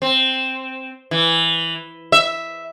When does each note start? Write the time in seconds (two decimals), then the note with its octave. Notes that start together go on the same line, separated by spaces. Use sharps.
0.02 C4
1.11 E3
2.12 E5